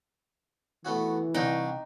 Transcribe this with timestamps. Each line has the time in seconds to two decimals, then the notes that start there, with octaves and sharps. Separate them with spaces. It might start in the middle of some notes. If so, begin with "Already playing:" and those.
0.85 E3 A3 B3 F#4
1.34 C2 D4 D#4 G5 C#6